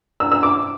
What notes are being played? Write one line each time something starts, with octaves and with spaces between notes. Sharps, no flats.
E6
E6
D6